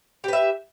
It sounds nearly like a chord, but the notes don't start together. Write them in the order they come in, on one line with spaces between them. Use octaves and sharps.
G4 B4 E5